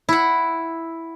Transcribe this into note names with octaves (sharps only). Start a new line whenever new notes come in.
E4 F#5